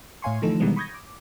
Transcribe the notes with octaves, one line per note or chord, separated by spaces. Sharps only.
A2 C#5 F5 G#5 C6 C#6
D3 E3 F3 A3 D#4 A4
B2 D#3 E3 G3 G#3 B3
B5 C#6 D#6 G6 G#6 A#6
D6